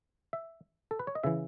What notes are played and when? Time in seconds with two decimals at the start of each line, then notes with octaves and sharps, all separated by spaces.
0.33 E5
0.91 A4
0.99 B4
1.07 C#5
1.15 D#5
1.23 C#3 E3 E5